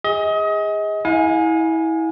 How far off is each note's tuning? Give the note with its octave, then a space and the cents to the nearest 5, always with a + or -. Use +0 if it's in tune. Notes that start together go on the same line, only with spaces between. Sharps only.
G#4 -25 D#5 +30
E4 -25 F5 +45 G#5 +0